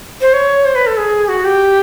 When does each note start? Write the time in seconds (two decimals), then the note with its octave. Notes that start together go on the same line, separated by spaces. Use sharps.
0.21 C5
0.33 C#5
0.65 C5
0.75 B4
0.87 A4
0.97 G#4
1.29 F#4
1.44 G4